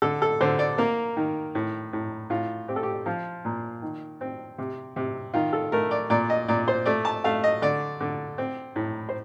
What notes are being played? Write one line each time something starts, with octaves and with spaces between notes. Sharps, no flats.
D3 A4
A4
D3 C5
D5
A#3 A#4
D#3
A2
A2
A2 F4
C4 G4
A4
G4
F3 F4
A#2
D#3
C4
C3
C3
D#3 F4
A4
A3 A#4
D5
A#2 D5
D#5
A#2 D5
C5
A3 D5
A5
A3 F5
D#5
D3 D5
D3
C4
A2
C5